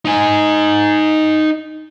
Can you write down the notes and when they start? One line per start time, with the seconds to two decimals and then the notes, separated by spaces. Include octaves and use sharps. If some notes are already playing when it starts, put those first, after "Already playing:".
0.05 D#4 G#5